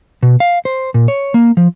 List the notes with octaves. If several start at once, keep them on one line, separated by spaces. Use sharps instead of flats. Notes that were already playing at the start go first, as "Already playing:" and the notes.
B2
F5
C5
A#2
C#5
A#3
F3